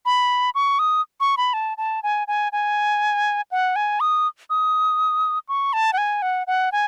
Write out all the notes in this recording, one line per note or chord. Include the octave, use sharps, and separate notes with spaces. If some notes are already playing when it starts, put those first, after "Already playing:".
B5
C#6
D#6
C#6
B5
A5
A5
G#5
G#5
G#5
F#5
G#5
D#6
D#6
C#6
A5
F#5
G#5
F#5
F#5
G#5